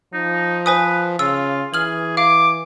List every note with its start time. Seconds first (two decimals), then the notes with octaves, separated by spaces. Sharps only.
0.13 F3 D#4
0.66 B4 C5 G#5 D#6
1.19 C#3 F4 E6
1.74 E3 G#4 F6 F#7
2.17 F5 D6